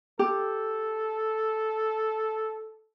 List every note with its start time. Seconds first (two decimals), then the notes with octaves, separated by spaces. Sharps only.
0.19 G4 A4